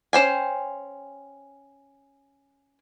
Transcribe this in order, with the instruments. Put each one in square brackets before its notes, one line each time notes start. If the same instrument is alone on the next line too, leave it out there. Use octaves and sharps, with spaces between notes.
[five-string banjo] C#4 C5 G5 G#5